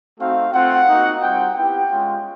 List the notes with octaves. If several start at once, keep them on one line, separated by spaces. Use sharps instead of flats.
A3 C4 D#4 F#4 F5
A3 C4 F4 F#5
A#3 D#4 F#4
G3 C4 F4 G5
B3 E4 G4 G5
G#3 C#4 F4